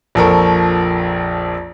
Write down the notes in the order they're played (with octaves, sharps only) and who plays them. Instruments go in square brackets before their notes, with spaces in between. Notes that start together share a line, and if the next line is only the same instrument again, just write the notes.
[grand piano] A#1 F2 F3 A4 A#4 C#6